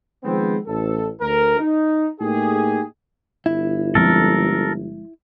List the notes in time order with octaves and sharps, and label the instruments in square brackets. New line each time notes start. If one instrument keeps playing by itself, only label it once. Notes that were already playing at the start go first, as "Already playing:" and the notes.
[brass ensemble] D#3 F3 G#3 B3 C4
A1 A4
D2 A#4
D#4
A2 A#3 D#4 G4 G#4
[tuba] G1 [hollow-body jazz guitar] E4
[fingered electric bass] F3 G#3 C4 [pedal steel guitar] A4 A#4